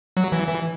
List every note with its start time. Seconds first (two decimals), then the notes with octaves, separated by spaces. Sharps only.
0.17 F#3
0.32 E3
0.48 E3